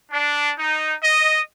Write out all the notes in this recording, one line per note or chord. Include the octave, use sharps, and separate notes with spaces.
D4
D#4
D#5